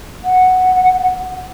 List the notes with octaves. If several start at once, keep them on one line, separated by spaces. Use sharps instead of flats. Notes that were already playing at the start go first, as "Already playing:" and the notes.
F#5